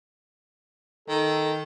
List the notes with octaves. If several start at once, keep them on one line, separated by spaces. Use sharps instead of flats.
D#3 A4